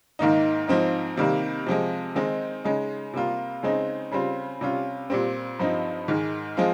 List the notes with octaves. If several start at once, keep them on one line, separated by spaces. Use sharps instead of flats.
G#2 D#3 A#3 D#4
G#2 F3 C4 D#4
C3 D#3 G3 A#3
C3 F3 G#3
D#3 G#3 C4 D#4
C#3 G#3 D#4
C3 G3 A#3 F4
C#3 G#3 C4 D#4
C#3 G3 C4 F4
C3 G3 C#4 F4
A#2 G3 C4
G2 F3 C4 D#4
G#2 D#3 G#3
F3 G#3 C4 F4